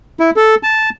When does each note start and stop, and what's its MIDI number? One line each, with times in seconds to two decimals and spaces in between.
0.20 0.30 64
0.36 0.55 69
0.63 0.90 81